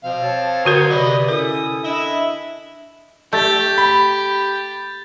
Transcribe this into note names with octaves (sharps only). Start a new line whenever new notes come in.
B2 F3 C4 F5
C#5 A5
D3 F#3 F#4 A#4 C#5 A#5 C6 C#6
C3 B4 D5 D#5
C#4 E4 A4 A#4 D#6
D4 E4 D#5 E5
A3 G4 G6 A6
B5